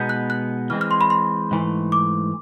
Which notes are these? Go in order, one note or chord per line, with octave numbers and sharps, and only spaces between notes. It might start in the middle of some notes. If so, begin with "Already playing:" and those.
Already playing: B2 G#3 B3 D#4 G6
F#6
F#6
E3 G#3 C4 F6
F6
C6
B5
C6
G#2 E3 A3
D6